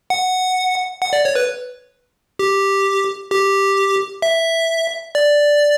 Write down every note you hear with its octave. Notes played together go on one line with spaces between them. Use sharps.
F#5
F#5
D5
C#5
B4
G4
G4
E5
D5